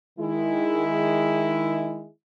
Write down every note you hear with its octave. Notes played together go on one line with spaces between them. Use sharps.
D#3 G#3 E4